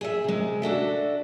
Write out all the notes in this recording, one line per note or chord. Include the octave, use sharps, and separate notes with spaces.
G#4 D#5 E5
C3 G#3
D4 F#4 A4 E5